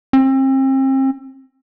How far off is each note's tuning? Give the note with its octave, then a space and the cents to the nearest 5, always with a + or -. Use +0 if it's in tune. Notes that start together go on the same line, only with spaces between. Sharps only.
C4 +35